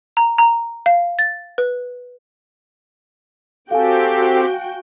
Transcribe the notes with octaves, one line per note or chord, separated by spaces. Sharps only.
A#5
A#5
F5
A6
B4
C4 F#4 G4 A4 F5 G5 G#5